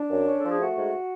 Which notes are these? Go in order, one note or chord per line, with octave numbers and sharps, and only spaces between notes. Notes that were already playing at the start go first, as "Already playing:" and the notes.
Already playing: D4
F#2
C#4
A4
F3
G#4
A3 F#4
G#2